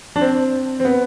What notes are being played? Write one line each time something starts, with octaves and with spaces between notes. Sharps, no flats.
D4
C4
C4
B3